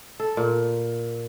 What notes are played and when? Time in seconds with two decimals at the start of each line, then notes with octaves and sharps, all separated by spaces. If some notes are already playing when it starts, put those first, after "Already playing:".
0.20 A4
0.37 A#2